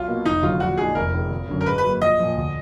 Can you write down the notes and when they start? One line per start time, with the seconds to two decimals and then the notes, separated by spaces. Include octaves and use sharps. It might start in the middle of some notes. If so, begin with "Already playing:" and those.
Already playing: B1 F4
0.08 B2 A#3
0.25 F1 D#4
0.42 D#2 D3 F#3 F4
0.60 A#1 F#4
0.77 A#2 G#3 D#4 G#4
0.95 F1 A#4
1.13 D#2 D#3 G#3
1.30 G#1
1.49 F#2 D3
1.61 A#4
1.66 G#2 B4
1.78 B4
1.84 F#3 A#3
2.02 A#1 D#5
2.19 A#2 F3
2.36 D2